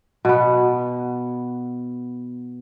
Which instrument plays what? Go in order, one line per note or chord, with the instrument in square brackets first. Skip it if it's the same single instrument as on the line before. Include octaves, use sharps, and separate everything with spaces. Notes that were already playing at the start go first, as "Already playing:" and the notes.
[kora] B2 B3